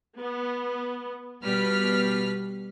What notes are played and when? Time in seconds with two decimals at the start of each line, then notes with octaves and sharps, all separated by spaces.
0.20 B3
1.44 B2 G3 B4 F6 B6